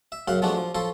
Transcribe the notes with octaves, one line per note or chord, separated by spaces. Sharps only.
E5
F#2 C#3 F5 F#5 B5
F3 G#3 A3 B3 D4 F#4
F3
F3 A4 C#5 C6